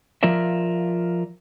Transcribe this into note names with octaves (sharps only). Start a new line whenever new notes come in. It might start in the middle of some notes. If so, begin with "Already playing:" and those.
F3 F4 A#4 D5 E5